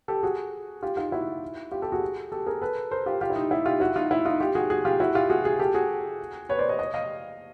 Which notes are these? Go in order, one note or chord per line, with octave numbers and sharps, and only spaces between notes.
G4 A4
F#4 G#4
F4 G4
D#4 F4
E4 F#4
F4 G4
G4 A4
F#4 G#4
G4 A4
G#4 A#4
A4 B4
A#4 C5
F4 G4
F4 G4
E4
D#4
E4
F4 G4
E4 F#4
D#4 F4
E4
D#4 F4
F4 G4
F#4 G#4
F#4 G#4
F4 G4
E4 F#4
F4 G4
F#4 G#4
F#4 G#4
G4 A4
F#4 G#4
B4 C#5
C5 D5
C#5 D#5
C#5 D#5
D#5 F5